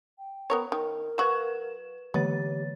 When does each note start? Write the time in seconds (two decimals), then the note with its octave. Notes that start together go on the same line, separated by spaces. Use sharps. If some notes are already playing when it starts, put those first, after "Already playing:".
0.19 G5
0.50 B3 A#4 C#5
0.72 D#3 A#4
1.18 F#3 F#4 B4 E7
2.14 D3 E3 B3 G4 A6